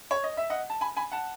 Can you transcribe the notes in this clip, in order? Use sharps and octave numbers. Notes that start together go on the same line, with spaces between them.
C#5
D#5
E5
D#5 F#5
A5
G#5 B5
G#5 B5
F#5 A5